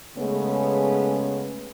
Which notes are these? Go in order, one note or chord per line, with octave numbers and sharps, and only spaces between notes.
C#3 G#3 A3 B3 C#4